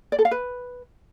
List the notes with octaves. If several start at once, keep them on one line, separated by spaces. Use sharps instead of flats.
D5
A4
F5
B4